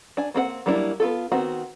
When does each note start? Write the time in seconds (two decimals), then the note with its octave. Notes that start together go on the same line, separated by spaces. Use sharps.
0.17 D4 G#5
0.34 A#3 C4 B4 F#5
0.66 F#3 G3 A#3 D4 E4
1.00 B3 F4 A4
1.32 D#3 B3 C4 F#4